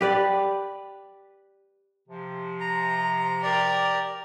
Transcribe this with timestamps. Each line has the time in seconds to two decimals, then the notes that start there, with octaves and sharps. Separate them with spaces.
0.01 G4 B4 D5
2.08 C3 F3
2.60 A#5
3.43 G4 A#4 D5